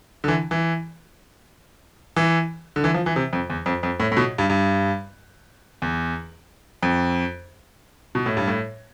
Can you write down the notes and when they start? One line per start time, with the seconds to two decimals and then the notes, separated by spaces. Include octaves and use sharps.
0.24 D3
0.28 E3
0.51 E3
2.16 E3
2.76 D3
2.84 E3
2.94 F3
3.06 E3
3.16 C3
3.33 F2
3.50 E2
3.66 F2
3.83 F2
4.00 A2
4.12 A2
4.17 B2
4.38 G2
4.50 G2
5.82 E2
6.83 F2
8.15 B2
8.26 A2
8.37 G2
8.48 A2